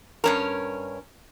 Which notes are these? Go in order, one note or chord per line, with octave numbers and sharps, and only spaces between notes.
G2 C#4 A#4